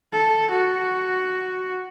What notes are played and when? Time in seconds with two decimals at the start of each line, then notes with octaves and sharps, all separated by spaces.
0.13 A4
0.50 F#4